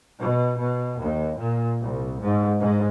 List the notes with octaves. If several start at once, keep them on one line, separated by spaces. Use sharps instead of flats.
B2
B2
D#2
A#2
C2
G#2
G#2